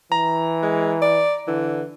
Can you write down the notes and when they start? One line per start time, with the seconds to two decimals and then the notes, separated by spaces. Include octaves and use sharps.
0.12 E3 A#5
0.63 G#3
1.02 D5
1.47 D3 E3